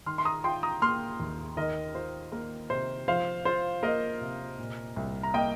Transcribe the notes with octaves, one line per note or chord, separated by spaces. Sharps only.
D#3 C6 F6
C6
A#5 D#6
F4 G5 C6
A#5 D#6
A#3 C6 F6
D#2
D#3 A#4 D#5
F4 C5
A#3 A#4
C3 C5
F3 C5 F5
F4 C5
A#3 A#4 D#5
C3
A#2
C2
A#5
A#3 D#5 G5